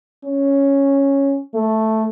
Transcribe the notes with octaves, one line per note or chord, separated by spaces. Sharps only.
C#4
A3